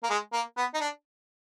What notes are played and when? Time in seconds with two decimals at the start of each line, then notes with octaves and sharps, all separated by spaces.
0.03 A#3
0.10 G#3
0.33 A#3
0.57 B3
0.74 D#4
0.80 D4